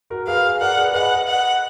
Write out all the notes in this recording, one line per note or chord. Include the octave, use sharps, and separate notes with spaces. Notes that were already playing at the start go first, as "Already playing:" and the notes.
F#4 A#4
G#4 B4 F5
A#4 D5 F#5
G#4 B4
B4 D#5 F#5
F#5